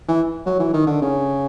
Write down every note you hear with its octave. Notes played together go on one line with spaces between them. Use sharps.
E3
F#3
E3
D#3
D3
C#3